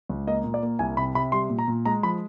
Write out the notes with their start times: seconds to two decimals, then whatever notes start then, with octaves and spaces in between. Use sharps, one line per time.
0.09 C#2
0.27 A#3 D#5
0.44 A#2
0.54 D5
0.63 A#3
0.79 C2 G#5
0.97 C3 B5
1.15 C3 B5
1.32 G3 C6
1.50 A#2
1.59 A#5
1.68 A#2
1.85 G#3 A#5
2.03 F3 B5